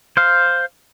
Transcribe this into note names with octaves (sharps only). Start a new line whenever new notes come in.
C5 F5